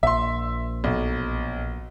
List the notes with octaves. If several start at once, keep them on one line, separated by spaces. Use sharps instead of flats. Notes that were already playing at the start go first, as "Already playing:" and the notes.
A#1 E5 C6
B1